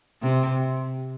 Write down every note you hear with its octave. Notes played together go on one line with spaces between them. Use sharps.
C3